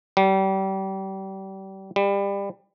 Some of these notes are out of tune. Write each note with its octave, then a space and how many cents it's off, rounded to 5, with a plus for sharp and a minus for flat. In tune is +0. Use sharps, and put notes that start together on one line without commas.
G3 -30
G3 +25